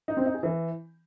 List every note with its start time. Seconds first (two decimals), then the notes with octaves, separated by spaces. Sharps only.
0.08 D#4
0.17 C4
0.26 D#4
0.34 G#4
0.43 E3